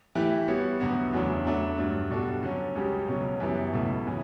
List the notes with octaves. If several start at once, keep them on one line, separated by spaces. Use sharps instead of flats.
E3 A3 E4 G4
G3 B3 F#4 C#5
D2 D3 F#3 B3 F#4
E2 C#3 F#3 A3 D4
F#3 A3 D4 A4
G2 F#3 A3 D4
B2 G3 D4 F#4 A4
D3 F#3 C#4
C#2 C#3 G3 C#4 G4
C#2 B2 F#3 C#4
F#2 E3 G3 B3
C#2 B2 A3 E4 A4
C#3 E3